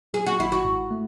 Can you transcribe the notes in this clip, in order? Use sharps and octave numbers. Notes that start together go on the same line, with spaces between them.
F#3 G#4
F#4
G#1 E4
F#4
G#2
A3